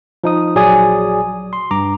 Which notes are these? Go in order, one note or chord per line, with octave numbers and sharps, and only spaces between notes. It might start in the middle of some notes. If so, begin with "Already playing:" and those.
F3 D#4 D#6
A#1 F#3 G#4 D5 G#5 D#6
C6
G2 A#5 D6